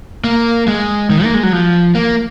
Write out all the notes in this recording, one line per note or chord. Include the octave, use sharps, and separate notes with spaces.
A#3
G#3
D#3
A#3
G#3
F#3
F3
A#3